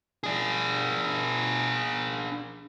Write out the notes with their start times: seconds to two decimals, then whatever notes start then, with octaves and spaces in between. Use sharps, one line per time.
0.24 D4 G#4